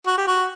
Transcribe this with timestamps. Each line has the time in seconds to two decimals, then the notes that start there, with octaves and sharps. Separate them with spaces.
0.07 F#4
0.18 G4
0.27 F#4